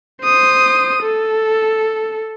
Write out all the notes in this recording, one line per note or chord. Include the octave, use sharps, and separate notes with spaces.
C5 D#6
A4